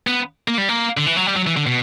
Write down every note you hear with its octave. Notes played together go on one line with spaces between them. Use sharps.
B3
A#3
G3
A#3
D3
E3
F#3
G3
F#3
E3
D3
B2